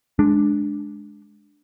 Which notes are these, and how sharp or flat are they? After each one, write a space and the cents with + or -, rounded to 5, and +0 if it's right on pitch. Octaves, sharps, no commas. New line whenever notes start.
G#3 +15 D4 +0